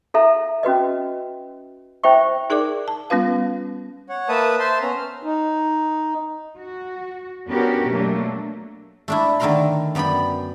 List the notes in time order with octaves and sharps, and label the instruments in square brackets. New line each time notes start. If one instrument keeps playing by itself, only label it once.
[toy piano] E4 A4 E5 A#5
C#4 F#4 B4 D#5
E4 C5 E5 G5 C#6
[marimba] D#4 G#4 A#4 D5 D6
A5
G3 B3 C#4 F4 B4 F5
[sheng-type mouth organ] C#5 F#5
A#3 B4 E5 A5 B5 D#6
C5 E5 A5 C6
B3 C#4 A#5
F6
[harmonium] D#4
[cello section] F#4
B3 C#4 D4 F#4 G4 A#4
B2 F#3 A3 A#3 D4
[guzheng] A3 D4 E4
D3 D#3 A3 A#4 A#5 C6
F#2 B3 D5 G5 B5